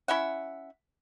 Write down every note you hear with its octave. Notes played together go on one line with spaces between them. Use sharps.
C#4 E4 E5 F#5